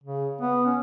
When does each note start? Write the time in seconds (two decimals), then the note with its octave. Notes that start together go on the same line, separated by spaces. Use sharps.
0.04 C#3
0.41 B3
0.66 C#4